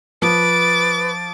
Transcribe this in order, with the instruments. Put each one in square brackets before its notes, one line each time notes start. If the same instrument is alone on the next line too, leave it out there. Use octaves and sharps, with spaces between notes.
[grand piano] F3 [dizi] B4 [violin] D6 A6